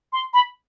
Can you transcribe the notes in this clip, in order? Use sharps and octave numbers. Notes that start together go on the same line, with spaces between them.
C6
B5